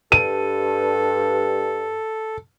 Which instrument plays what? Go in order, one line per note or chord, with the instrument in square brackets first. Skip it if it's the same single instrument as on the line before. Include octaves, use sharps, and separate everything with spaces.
[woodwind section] G2 [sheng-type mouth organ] A4 [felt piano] D#7